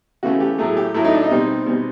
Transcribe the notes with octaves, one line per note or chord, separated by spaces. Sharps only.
C#3 E3 A3 C#4 F#4
G4
A2 F#3 A3 G#4
G4
A2 F#3 A3 E4
D#4
D4
D#4
B2 G3 C4
B2 G3 C4